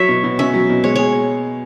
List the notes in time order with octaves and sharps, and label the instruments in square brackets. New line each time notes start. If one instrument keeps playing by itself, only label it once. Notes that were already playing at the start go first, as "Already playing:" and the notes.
Already playing: [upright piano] F#3 [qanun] C#5 E5
[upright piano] B2
B2
[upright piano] C#4 [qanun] E5
[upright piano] F#3
B2
[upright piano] G#3 [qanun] C#5
[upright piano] G#4 [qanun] C#5